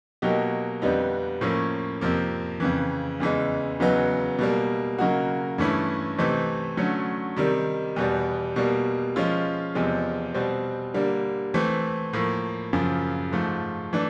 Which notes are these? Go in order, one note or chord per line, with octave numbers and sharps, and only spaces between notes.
B2 F#3 A#3 D#4 G4
F2 D3 G3 B3 D#4
A2 F3 A#3 C#4
F2 C3 F3 A#3
F2 C#3 E3
E2 C#3 E3 G#3
E2 C#3 F#3 B3 D#4
B2 G3 A#3
C#3 F#3 A#3 D#4 F#4
G2 E3 A3 C#4 E4
C3 E3 A3 C4 D#4
D3 F#3 A3 C#4
C3 D#3 G3
E2 B2 G3
B2 G3 A#3
F3 G#3 C#4 F4
E2 C3 F3 G#3
B2 G3 C4
D3 G3 A#3
E3 A3 C4
A2 F3 A#3
F#2 C#3 F3
G#2 F3 A3
E3 A3 D4